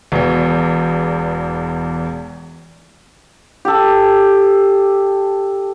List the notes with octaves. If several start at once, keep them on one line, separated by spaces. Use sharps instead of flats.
E1 E2
G4 A4